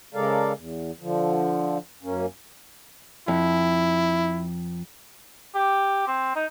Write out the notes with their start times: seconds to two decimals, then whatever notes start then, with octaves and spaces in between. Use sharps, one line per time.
0.14 C#3 G#3 A4 A#4 D5 F5
0.56 E2
1.01 D3 F3
2.03 F#2 A#3 C#4
3.28 F2 E4
5.55 G4
6.07 C4
6.36 D#4